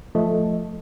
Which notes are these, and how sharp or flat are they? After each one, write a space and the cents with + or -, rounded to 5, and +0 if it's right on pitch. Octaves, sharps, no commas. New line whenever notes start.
F3 +0 A3 +0 D#5 +0